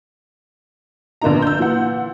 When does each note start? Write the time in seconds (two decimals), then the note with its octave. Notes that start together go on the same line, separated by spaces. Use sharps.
1.22 A#1 D3 A#3 B3 D#4 A#5
1.42 E6 G6
1.59 A#2 E3 F#5